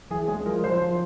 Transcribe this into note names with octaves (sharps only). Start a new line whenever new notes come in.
E3 G#4
G#3 G#4
F3 A#4
F3 C5
F3